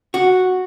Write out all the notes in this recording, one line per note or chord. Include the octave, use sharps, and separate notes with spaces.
F#4